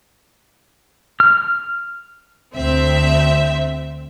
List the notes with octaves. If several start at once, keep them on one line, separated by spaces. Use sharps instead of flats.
F6
D2 C4 E5